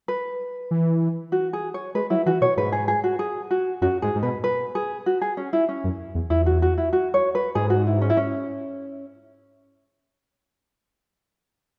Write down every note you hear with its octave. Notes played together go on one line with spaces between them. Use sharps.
B4
E3
F#4
G#4
C#5
G#3 B4
F#3 E4
E3 F#4
B2 C#5
G#2 B4
G#4
G#4
F#4
G#4
F#4
F#2 F#4
G#2 G#4
G#2
B2 B4
B4
G#4
F#4
G#4
C#4
E4
C#4
F#2
E2
E2 E4
F#4
F#4
E4
F#4
C#5
B4
G#2 G#4
F#4
E4
C#4
E4
C#4